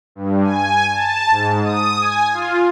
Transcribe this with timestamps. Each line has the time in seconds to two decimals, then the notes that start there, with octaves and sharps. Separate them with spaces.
0.15 G2
0.44 G#5
0.93 A5
1.30 G#2
1.63 D#6
1.99 G#5
2.33 F4